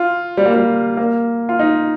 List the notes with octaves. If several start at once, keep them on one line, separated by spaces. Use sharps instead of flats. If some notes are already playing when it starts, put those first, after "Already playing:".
Already playing: F4
G3
A#3
G3
A#3
F4
D#4